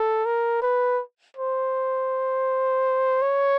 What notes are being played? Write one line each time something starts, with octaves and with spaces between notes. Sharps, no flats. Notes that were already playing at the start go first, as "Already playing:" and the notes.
Already playing: A4
A#4
B4
C5
C#5